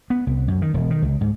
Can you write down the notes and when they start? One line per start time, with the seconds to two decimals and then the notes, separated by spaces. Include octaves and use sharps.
0.10 B3
0.27 C2
0.48 F#2
0.62 D#3
0.74 E1
0.90 D#3
1.02 C#2
1.21 G#2